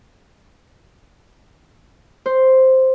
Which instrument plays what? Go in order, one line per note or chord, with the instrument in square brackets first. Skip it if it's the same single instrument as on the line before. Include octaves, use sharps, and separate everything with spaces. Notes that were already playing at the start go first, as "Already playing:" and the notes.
[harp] C5